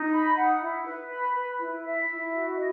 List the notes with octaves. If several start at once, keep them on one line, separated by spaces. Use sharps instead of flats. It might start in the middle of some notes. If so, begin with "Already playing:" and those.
Already playing: D#4
B5
F#5
E4
B4
B5
B4
E4
E5
E4
F#4
D#5